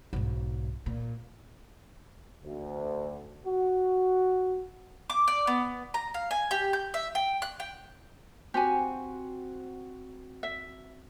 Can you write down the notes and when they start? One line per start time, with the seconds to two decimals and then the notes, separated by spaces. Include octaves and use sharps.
0.13 B1 G#2
0.86 A#2
2.44 D2
3.45 F#4
5.10 D6
5.28 D5
5.47 B3
5.94 A#5
6.14 F5
6.31 G#5
6.51 G4
6.73 G6
6.94 E5
7.15 G5
7.42 F#6
7.60 G5
8.54 C4 F#4 G4 G#5
10.43 E5